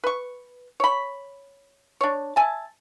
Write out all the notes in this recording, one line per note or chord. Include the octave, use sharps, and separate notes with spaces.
B4 C#6
C#5 B5
D4 C#5
E5 G#5 A5